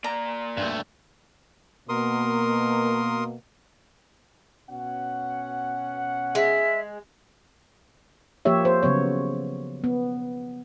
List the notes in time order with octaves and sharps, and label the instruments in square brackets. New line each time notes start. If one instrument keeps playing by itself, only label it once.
[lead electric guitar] A#3 D5 [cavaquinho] A#5
[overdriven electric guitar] G2 A3
[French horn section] B2 A#3 [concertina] A#4 C6 D#6
[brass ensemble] B2 C#4 F#5
[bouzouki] G#3 [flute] E5
[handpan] F3 A#3 G4 C#5 E5
C5
C#3 F#3 B3 C#5
B3